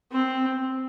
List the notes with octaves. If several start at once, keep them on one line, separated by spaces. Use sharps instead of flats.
C4